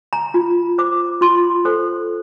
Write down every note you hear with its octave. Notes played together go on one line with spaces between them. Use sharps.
A#5
F4
C5 D6
F4 C6
A4 C5